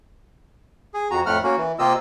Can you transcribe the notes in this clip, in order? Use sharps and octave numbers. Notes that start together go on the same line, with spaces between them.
G#4
F2 F#4 A#5
F2 A2 A3 F#5 F6
A#3 C#4 F#4
E3
C3 A#3 F4 G4 D#5 E6